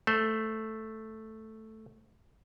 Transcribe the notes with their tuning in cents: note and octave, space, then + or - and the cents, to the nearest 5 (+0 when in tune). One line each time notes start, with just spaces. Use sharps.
A3 +0 C5 +0